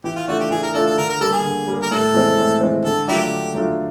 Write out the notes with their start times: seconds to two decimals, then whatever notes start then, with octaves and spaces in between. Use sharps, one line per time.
0.04 E3 G4
0.16 F4
0.28 A3 D4 F4 F#4
0.40 G4
0.51 E3 G#4
0.63 A#4
0.74 A3 D4 F4 A4
0.87 A4
0.98 D3 A#4
1.09 A#4
1.21 G3 A#3 A4
1.32 G#4
1.44 D3
1.68 G3 A#3
1.82 A#4
1.91 A2 A4
2.14 E3 G#3 C4
2.38 A2
2.61 E3 G#3 C4
2.85 D3 A4
3.08 F#3 A3 A#3 D4 E4 F4 G4
3.31 D3
3.55 F#3 A3 D4 F4